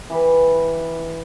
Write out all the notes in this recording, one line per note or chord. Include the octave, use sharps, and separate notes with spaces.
E3 G4 B4